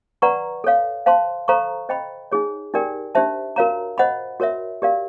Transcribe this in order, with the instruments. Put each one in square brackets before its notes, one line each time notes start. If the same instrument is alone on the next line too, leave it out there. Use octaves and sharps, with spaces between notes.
[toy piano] B4 D5 F#5 A#5 C#6
A4 C#5 F5
C5 F5 A5 C6
A4 C5 F5 A#5 C#6
C5 D#5 G5 B5
D#4 G#4 C#5
D#4 G4 A#4 D5 G5
D4 G4 C5 E5 A5
F#4 A#4 C#5 F5 A#5
C5 D#5 F#5 B5
F#4 A#4 C#5 E5
G4 A#4 D5 F5